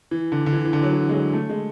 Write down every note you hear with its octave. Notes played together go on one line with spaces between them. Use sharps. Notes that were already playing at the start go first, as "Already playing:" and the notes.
E3
D3
D3
E3
E3
D3
F#3
E3
G#3
F#3
A3
G#3